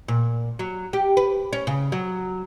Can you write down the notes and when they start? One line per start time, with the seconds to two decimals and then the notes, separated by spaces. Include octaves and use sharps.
0.08 A#2
0.59 F#3
0.93 G4
1.17 B4
1.53 C#4
1.67 C#3
1.92 F#3